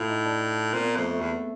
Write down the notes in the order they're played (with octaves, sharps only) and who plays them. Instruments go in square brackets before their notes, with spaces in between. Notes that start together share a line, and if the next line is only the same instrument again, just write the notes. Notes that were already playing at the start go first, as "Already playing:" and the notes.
Already playing: [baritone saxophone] A2 [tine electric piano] E4 F4
[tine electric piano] D#4
D4
[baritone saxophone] A#2 [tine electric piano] C4
[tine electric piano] B3
A#3
[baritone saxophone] F2 [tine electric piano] A3
[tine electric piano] A3
[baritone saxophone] E2